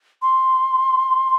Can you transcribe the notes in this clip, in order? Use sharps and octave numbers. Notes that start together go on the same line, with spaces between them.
C6